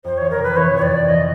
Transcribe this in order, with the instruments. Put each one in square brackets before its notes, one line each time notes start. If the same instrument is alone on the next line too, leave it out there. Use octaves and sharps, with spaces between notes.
[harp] F2 [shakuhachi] C5
[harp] E3 [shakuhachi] C#5
[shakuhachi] A#4
[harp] C3 [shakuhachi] B4
[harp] E3 [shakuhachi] C#5
[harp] F2 [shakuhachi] C#5
[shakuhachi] D5
[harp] F2
[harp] E3 [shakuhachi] D#5